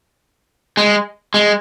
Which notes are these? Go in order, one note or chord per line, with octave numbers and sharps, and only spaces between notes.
G#3
G#3